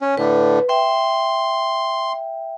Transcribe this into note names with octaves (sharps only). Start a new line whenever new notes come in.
C#4
A2 D3 B4
E5 G5 C6